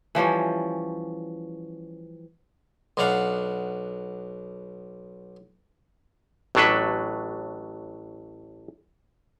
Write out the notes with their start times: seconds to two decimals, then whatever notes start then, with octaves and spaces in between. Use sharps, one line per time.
0.15 E3 F3 G3 C#4
2.97 B1 B2 D4 F5 F#5
6.55 A1 A2 F#3 D4 A4 B4